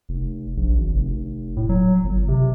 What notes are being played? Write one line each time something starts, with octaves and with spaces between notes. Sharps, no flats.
F1
A#1
G#1
F1
A2
F#3
G1
C3